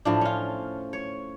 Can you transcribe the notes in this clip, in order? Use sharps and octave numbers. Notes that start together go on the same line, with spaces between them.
A2 F3 D4
C#4 F4
C#5